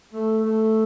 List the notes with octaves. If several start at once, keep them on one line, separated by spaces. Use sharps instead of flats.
A3
A3